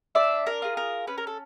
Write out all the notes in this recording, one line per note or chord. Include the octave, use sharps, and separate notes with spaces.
D4 D5 E5
A#4
F4 G#4
A#4
C#4 B4
A#4
A4